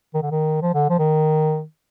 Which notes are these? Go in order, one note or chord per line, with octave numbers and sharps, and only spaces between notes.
D#3
D3
D#3
F3
D3
F3
D#3